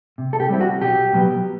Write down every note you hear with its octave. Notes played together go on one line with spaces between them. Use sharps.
C3
A4
G4
G3 C4 E4
F#4
B1 G4
B2 F#3 B3